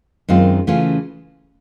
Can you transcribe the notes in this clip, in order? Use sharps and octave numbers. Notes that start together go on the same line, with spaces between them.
F#2 D#3 G#3 C4 F4
C#3 E3 A3 C#4 F4